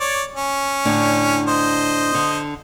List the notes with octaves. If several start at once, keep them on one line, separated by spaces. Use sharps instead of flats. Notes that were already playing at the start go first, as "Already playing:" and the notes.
C#5 D5
C#4
A2 D3 D4
C5 D#5
D3